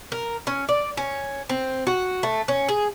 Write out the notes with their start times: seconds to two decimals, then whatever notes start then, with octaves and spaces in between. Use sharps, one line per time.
0.12 A#4
0.47 C#4
0.69 D5
0.97 C#4
1.49 C4
1.87 F#4
2.23 A3
2.48 C#4
2.69 G#4